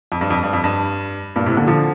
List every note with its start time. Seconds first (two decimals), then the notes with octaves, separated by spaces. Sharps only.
0.12 F2
0.21 G2
0.30 F2
0.43 G2
0.53 F2
0.64 G2
1.36 G2 A#2
1.46 A2 C3
1.57 A#2 D3
1.67 D3 F3